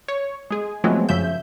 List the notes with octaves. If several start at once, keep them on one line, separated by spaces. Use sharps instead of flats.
C#5
G#3 G#4
F3 F#3 G#3 A3 B3 C4
F#2 C#3 F3 E5 G6